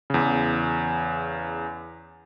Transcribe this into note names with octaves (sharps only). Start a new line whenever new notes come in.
E2 C#3